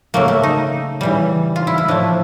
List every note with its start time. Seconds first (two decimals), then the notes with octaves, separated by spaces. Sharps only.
0.14 C#3 F#3 A3 A#3
0.28 A3
0.43 D#4
1.01 C#3 E3 G3
1.56 F4
1.67 E4
1.78 E4
1.88 A2 F3 A3 D4